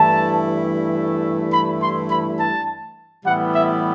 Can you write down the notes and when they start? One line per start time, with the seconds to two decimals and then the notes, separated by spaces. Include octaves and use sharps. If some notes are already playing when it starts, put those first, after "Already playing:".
Already playing: G2 E3 A3 E4 A5
1.52 B5
1.81 C6
2.10 B5
2.39 A5
3.25 A2 E3 G3 B3 E4 F#5
3.54 E5